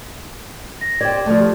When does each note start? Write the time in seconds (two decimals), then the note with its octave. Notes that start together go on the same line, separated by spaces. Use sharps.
0.81 A#6
1.01 G4 C5 D5 G#6
1.26 F3 A3 D5
1.40 G4